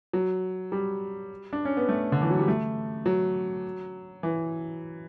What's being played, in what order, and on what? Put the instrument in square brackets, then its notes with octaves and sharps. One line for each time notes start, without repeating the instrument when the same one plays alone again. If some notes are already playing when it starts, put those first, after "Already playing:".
[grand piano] F#3
G3
D4
C#4
B3
A3
D3
E3
F#3
G3
A3
F#3
E3